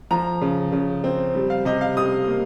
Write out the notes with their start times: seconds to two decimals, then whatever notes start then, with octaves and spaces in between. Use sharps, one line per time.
0.11 F3 A#5
0.41 C#3
0.72 C#3
1.04 C4
1.35 G3
1.50 F5
1.65 C3 D#5
1.81 F5
1.97 C3 D#6
2.28 A#3